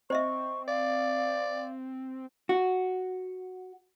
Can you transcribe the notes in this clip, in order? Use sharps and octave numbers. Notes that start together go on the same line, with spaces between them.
C4 C5 D#5 E5 C#6
D5 F5
F#4